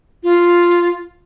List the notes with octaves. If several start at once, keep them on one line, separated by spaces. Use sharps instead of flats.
F4